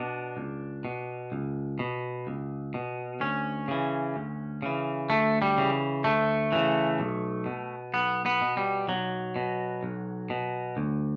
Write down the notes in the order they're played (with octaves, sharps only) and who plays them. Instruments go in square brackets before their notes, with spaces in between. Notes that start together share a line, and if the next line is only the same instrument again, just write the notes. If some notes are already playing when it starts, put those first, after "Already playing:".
Already playing: [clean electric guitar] B2 D4
C#2
B2
C#2
B2
C#2
B2
D2 C#4
C#3 E3
D2
C#3 E3
D2 A3
G3
C#3 E3
D2 A3
C#3 E3
B1
B2
B1 B3
B3
B2
G3
B1 F#3
B2
B1
B2
D2